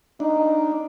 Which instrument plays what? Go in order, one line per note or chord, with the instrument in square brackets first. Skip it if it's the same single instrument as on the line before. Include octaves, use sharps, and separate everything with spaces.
[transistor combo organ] D4 [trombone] D#4